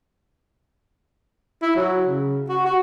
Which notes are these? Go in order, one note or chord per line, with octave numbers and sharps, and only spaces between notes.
E4
F#3
C#3
F#4
F#4